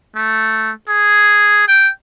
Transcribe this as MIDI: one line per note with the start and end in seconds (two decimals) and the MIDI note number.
0.16 0.71 57
0.89 1.66 68
1.68 1.90 79